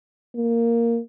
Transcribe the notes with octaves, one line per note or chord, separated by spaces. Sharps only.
A#3